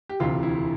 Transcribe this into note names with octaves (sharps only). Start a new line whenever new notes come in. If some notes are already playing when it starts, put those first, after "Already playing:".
G4
E1 D2 C3 E3 F4
E4